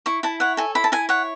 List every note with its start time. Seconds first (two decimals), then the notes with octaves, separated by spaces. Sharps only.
0.06 E4 C#6
0.23 E4 A5
0.40 C#5 F#5
0.57 A4 G#5
0.75 E4 B5
0.84 A5
0.92 E4 G#5
1.09 C#5 F#5